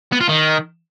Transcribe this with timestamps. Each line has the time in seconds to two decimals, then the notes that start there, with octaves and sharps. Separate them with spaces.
0.12 B3
0.21 F4
0.29 D#3